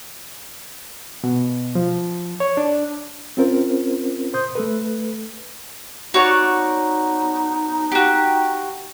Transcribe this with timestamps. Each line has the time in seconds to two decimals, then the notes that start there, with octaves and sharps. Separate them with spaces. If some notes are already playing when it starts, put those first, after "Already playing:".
1.24 B2
1.75 F3
2.40 C#5
2.57 D4
3.37 C4 C#4 F4 A#4 C5
4.34 C5 C6 D#6 G6
4.55 A3 A4 B4
6.14 D#4 F#4 C#5 D5
7.92 F#4 G4